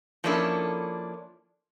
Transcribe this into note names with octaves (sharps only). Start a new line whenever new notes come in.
F3 A#3 C#4 D4 E4 A4